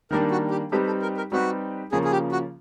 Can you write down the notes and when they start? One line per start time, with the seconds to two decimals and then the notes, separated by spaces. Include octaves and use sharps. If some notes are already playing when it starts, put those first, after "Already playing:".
0.11 D#3 G3 A#3 D4 A#4
0.31 F#4
0.51 G4
0.71 G3 C4 D#4 G4 A4 B4
0.86 A4
1.02 A#4
1.17 A#4
1.32 G3 C4 D#4 F#4 G4 B4
1.92 C#3 F3 A#3 C#4 F4 G#4
2.05 G#4
2.12 G4
2.32 F#4